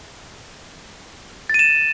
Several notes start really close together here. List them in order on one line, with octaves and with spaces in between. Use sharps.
A6 D#7 E7